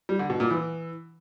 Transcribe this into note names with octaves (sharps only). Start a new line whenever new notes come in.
G3
D3
B2
A#2
E3